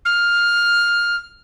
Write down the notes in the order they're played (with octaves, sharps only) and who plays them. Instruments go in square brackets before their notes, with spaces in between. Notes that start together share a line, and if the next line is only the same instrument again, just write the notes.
[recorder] F6